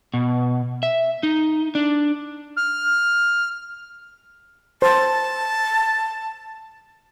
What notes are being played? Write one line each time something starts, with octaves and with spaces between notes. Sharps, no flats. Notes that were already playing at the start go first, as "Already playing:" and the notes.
B2
E5
D#4
D4
F6
C5 A5